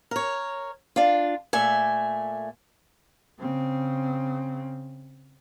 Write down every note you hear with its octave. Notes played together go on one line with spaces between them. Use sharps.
A#4 C#5
D4 F4
A#2 A3 E5 G#5
C#3 C4